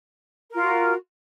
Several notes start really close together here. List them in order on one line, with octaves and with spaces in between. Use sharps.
A#4 F4 F#4